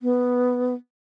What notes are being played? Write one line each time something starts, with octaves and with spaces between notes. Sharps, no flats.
B3